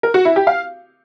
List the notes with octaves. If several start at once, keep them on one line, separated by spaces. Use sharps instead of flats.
A#4
F#4
E4
G4
F5